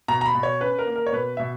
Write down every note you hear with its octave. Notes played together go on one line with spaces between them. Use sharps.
B2 A#5
A#5
B5
B2
C#5
C#4 B4
A#4
A#3
A#4
C#5
B2 B4
B2 E5